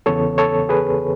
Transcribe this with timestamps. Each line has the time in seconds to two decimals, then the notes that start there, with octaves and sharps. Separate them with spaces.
0.06 E2 C#3 E3 B3 A4 C#5
0.38 A4 C#5
0.69 G#4 B4